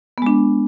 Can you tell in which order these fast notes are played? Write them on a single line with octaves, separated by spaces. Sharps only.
B3 G#3 D4